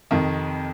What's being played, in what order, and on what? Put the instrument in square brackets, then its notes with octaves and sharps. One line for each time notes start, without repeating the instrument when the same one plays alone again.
[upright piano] F2 C3 D#3